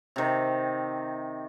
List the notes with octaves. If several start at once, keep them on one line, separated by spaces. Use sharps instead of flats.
C3 D#3